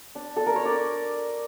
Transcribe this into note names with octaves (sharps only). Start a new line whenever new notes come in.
D4
D4 A4
A#4
C#5
D4 D5